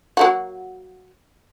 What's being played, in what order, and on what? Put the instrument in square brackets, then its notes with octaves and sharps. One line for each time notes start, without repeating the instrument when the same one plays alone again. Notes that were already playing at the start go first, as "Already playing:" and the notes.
[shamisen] F#3 A#3 F#4